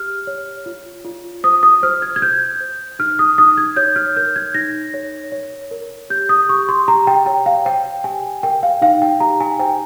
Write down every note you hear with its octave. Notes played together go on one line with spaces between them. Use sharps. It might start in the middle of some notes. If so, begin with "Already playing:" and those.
Already playing: G4 F6
C#5
F4
F4
C5 D#6
D#6
C5 F6
G#6
G#6
C5 G6
C5
D#4 F6
D#6
D#4 D#6
G#6
C#5 G6
F6
A#4 G6
G#6
D#4 A#6
C#5
C#5
A#4
G4 G6
D#6
G4 C#6
C6
G4 A#5
G5
C#5 G5
F5
C5 G5
G4 G#5
A#4 G5
F5
D#4 F5
G5
G4 A#5
G#5
C5 G5